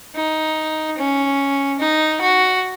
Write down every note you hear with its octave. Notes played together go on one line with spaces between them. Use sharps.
D#4
C#4
D#4
F#4